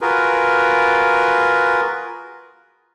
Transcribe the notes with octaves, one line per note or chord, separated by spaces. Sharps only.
F4 F#4 G#4 A#4 B4